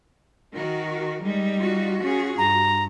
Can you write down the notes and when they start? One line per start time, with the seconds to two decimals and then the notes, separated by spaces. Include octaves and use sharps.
0.54 D#3 F#4 A#4
1.22 G3 G#3 D#4
1.58 F4 F#4
2.03 C#4 G#4
2.38 G2 A#5